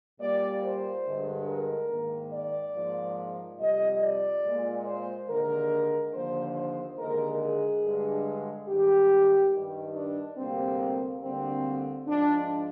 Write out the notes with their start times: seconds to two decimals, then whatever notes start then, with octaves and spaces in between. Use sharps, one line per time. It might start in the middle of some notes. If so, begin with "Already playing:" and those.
0.20 A#2 G3 A#3 D5
0.63 C5
1.06 G2 D3 G#3
1.47 A#4
1.90 G#2 D#3 A#3
2.32 D5
2.74 G#2 F3 A#3
3.59 F2 C3 G3 D#5
4.02 D5
4.45 A#2 G#3
4.86 C5
5.29 D#2 D3 G#3 A#4
6.14 D#2 D3 F3 A#3 C5
6.56 C5
6.98 D#2 D3 G#3 A#4
7.41 G#4
7.83 G2 D3 G#3
8.68 G#2 D#3 G3 G4
9.53 G2 D#3 G3
9.96 D4
10.38 D2 C3 G3 A#3 C4
11.22 D2 D3 G3 A#3 C4
12.07 G#2 F3 G#3 D4